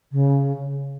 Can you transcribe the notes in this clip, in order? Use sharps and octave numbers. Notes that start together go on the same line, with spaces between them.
C#3